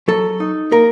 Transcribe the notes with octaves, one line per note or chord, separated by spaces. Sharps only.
F#3 A4
D#4
A#3 A#4